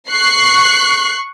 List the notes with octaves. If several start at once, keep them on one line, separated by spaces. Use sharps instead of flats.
C#6 F#6 C7